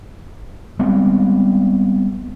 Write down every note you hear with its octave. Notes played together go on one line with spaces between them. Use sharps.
G3 G#3 B3 C4